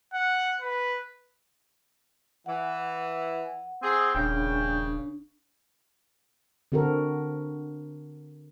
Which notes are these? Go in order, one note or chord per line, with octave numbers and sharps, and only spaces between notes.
F#5
B4
E3 F#5
C4 G#4
D#1 C#3 D4 G5
D3 C4 F#4 A4 A#4